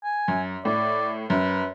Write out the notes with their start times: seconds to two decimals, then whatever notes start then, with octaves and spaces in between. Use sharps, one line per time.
0.03 G#5
0.28 F#2
0.65 A2 D5
1.30 F#2 B4